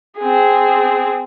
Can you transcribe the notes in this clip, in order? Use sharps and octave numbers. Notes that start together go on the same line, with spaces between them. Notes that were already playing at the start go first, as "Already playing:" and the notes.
C4 G#4